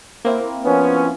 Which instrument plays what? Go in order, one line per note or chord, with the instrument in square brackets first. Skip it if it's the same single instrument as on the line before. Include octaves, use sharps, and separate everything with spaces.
[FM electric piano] A#3 C4 E4
[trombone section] F3 C#4 [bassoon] B3